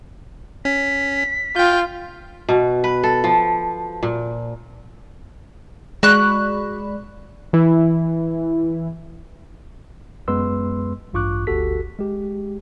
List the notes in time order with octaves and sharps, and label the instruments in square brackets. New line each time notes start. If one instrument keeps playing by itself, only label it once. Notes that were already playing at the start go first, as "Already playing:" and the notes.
[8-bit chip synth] C#4 [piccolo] B6
[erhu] F4 [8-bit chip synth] G5 G6
[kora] B2
B4
A4
F3
A#2
[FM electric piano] G#3 D5 B5 [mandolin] F#4 F#6
[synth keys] E3 E4
[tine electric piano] F#2 G#3 B3 B4 C6 E6
A1 G2 F4 C#6 D6 F#6
G1 D2 F#4 G4 A4 B6
G#3 G4